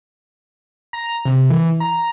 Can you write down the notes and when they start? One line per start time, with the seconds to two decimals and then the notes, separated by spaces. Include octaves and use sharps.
0.93 A#5
1.25 C3
1.50 E3
1.80 A#5